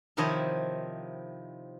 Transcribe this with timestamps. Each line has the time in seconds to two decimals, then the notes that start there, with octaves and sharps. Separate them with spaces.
0.17 C3 D#3 F3 E4 C#5 D#5